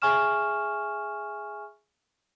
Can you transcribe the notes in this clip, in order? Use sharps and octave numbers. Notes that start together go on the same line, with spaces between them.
G#4 E5 G#5 C#6 F6 E7